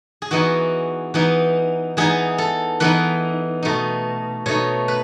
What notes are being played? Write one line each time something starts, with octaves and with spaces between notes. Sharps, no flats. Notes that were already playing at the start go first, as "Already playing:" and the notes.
G#4
E3 B3 D#4 F#4
E3 B3 D#4
E3 B3 D#4 G#4
A4
E3 B3 D#4 B4
B2 A3 D#4
B2 A3 D#4 C#5
B4